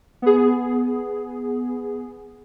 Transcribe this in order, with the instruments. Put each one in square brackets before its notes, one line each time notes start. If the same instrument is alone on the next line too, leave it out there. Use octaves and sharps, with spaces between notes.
[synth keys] B3 G#4